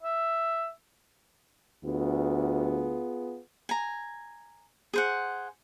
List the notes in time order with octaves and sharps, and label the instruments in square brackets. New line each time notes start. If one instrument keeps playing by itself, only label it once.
[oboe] E5
[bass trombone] D2 [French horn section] B3 F4 G#4
[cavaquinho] G#5 A#5
G#4 C5 F#5